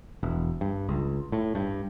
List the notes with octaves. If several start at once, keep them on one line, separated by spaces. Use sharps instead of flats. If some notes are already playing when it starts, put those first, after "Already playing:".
E1
G2
C#2
A2
G2